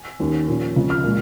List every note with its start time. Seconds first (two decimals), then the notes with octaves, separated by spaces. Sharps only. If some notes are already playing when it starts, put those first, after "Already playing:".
Already playing: G#5
0.20 D#2 D#3 C#4
0.48 A#2 F3 C#4
0.76 C#2 C#3 F3
0.90 F6
1.04 A#2 G#3